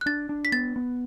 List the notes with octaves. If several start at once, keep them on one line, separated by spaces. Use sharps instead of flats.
F#6
D4 A6
D4
B6
B3 A6
B3